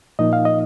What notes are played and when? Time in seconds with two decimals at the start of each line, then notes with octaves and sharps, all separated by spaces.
0.19 A#2 F3 A#3 D#4 D#5
0.33 F5
0.45 D#5